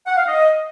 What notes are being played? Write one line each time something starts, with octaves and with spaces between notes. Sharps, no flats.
F#5
F5
D#5